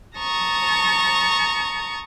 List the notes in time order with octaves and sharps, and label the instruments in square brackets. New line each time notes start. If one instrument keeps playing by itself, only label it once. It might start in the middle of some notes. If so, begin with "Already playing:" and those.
[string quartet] A5 A#5 C#6 D#6